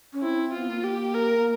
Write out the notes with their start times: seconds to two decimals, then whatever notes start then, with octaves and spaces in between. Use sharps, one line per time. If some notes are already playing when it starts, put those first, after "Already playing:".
0.13 C#4
0.22 C4 E4
0.53 B3 F4
0.69 A#3
0.84 G4
1.15 A#4